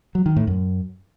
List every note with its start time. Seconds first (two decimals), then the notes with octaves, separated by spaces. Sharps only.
0.15 F#3
0.26 D#3
0.36 A2
0.47 F#2